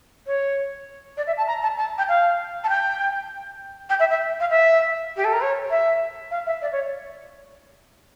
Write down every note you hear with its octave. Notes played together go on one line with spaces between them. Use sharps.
C#5
D5
E5
A5
A#5
A5
A5
G5
F5
A5
G5
G5
E5
E5
F5
E5
G4
A4
A#4
C#5
E5
F5
E5
D5
C#5